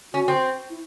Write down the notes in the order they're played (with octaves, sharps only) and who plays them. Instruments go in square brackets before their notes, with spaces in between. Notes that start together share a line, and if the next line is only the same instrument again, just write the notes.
[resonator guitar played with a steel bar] C#4 [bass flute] F#4
[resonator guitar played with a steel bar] C4
[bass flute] E4